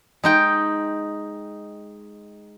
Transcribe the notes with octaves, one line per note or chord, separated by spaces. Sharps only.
G#3 D#4 G5